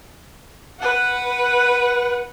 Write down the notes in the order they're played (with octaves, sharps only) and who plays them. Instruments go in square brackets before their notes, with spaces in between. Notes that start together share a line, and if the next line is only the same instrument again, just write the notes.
[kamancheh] B4 F#5